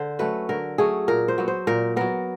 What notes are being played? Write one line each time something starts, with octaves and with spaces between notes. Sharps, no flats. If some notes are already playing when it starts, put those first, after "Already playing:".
Already playing: D3 C5
F#3 A3 C#4 B4
D3 A#4
F#3 A3 C#4 G#4
A#2 A#4
C5
F#3 B3
C5
A#2 A#4
F#3 B3 A#4